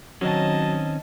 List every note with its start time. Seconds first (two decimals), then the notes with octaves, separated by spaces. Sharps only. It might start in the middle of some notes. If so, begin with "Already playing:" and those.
0.21 D#3 F#3 C4 C#4 D#5 A5